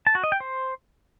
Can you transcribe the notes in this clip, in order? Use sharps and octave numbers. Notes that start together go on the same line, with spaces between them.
A5
F#4
D#5
G5
C5